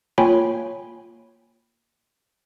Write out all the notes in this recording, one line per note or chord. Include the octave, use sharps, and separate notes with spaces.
A#3 F4 C#5 G5 G#5 B5